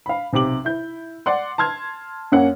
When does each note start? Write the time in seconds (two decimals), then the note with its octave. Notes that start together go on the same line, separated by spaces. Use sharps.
0.06 F5 B5
0.33 B1 C3 G4 D6 F#7
0.65 E4 G6
1.26 D5 F#5 C6
1.58 A5 C6 F6 G#6
2.32 F#2 A#3 C#4 F#5